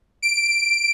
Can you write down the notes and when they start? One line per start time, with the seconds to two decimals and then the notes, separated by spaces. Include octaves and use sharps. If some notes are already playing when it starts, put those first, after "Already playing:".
0.22 D7